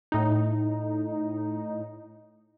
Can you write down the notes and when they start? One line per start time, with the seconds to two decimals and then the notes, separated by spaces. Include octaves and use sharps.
0.12 A2 D#4